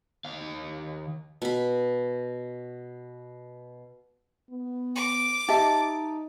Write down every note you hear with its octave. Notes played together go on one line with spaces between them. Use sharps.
D#2 F5
B2 B5
B3
D6
D#4 G4 D#5 E5 A5